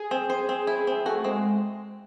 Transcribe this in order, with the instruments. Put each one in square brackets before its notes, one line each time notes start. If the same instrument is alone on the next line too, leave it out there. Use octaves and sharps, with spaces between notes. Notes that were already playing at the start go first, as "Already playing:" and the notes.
Already playing: [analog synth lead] G#4
[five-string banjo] C4
C5
C4
E4
C4
[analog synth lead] A3 [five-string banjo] F#4
[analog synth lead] G#3 [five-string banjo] C4